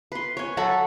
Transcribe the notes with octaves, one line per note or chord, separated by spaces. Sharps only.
B4 C6
C#5 G#5
F#3 F#4 A4 B5